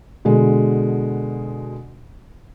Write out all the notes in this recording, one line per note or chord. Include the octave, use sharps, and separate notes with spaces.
B2 D3 G#3